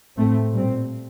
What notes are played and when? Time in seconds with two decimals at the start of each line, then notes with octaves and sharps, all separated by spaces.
0.16 A2 A3 C4
0.53 A#2 G3 C4